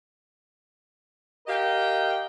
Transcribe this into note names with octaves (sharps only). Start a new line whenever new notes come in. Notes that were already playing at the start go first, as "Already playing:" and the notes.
G4 A#4 D#5 F5 G5